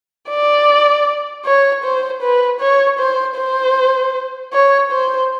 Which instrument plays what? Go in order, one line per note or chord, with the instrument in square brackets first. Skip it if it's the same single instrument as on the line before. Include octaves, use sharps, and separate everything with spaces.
[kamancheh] D5
C#5
C5
B4
C#5
C5
C5
C#5
C5